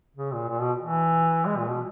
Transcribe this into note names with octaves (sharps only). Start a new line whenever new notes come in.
C#3
A#2
A#2
B2
E3
G#3
A#2
B2